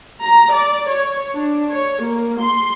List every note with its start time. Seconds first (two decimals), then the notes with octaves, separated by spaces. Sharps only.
0.24 A#5
0.54 D5
0.89 C#5
1.34 D4
1.72 C#5
2.04 A#3
2.41 C6